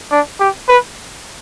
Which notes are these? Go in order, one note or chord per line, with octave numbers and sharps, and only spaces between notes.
D4
G4
B4